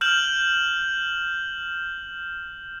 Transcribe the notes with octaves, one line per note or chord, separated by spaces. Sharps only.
F6 G6 E7 F#7